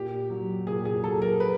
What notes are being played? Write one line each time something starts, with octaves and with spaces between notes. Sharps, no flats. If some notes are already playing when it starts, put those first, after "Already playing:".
Already playing: A#2 G4
F#3
A#2 G#4
G#4
F#3 A4
A#4
B4